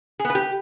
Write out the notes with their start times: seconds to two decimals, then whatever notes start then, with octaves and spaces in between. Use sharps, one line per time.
0.20 G#4
0.25 B3
0.30 B4
0.35 G4